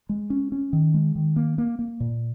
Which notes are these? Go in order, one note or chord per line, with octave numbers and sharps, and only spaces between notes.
G#3
C#4
C#4
D#3
G#3
D#3
A#3
A#3
A#3
A#2